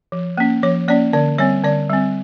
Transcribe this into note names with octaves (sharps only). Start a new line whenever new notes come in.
F3
A#3 C#4
F3 C#5
A#3 C#4 D5
D3 D5
G3 C4 C#5
D3 D5
G3 C4